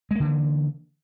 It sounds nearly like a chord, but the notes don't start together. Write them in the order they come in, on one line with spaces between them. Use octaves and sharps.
G#3 A#3 D3 E3